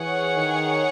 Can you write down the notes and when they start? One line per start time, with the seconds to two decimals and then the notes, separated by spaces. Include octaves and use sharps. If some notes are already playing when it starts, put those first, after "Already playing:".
Already playing: E3 G#4 C#5 F#5
0.36 D#3